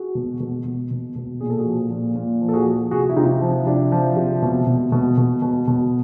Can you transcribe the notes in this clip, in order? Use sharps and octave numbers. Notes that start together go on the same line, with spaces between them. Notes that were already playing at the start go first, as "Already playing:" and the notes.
Already playing: F#4 G#4
B2
B2
B2
B2
B2
A#2 G#4
A4
F#4 G#4
F3
A#2
A#2
F3
A4
F#4 G#4
F3
C3 F#4 G#4
E4
C3 D#4 F4
F3
C3 D4 E4
F3
C3
B2
B2
B2
B2
B2
B2